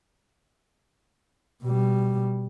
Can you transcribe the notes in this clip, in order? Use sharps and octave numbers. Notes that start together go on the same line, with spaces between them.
B2 G3